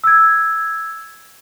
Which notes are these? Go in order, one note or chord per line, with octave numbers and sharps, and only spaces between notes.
E6 G#6